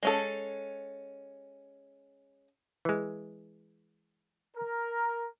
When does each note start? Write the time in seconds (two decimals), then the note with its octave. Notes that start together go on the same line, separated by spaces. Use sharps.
0.03 G#3 C#4 A4
2.85 E3 G#3
4.57 A#4